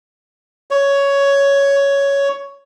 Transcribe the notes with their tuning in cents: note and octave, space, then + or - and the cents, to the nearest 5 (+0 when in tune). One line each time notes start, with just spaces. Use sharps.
C#5 +10